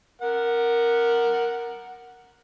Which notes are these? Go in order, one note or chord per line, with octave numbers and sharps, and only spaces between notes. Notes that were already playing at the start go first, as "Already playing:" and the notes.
A#4 F#5